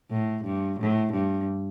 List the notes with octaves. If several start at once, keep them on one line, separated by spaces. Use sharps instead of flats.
A2
G2
A2
G2